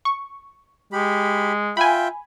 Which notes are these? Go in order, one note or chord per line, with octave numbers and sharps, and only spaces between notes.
C#6
G#3 G4 B5
F4 E5 G5 G#5 B5